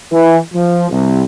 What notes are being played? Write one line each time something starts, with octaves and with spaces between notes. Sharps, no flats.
E3
F3
C2